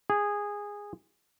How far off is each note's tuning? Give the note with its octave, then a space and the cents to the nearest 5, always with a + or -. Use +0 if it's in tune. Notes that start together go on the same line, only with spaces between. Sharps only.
G#4 -15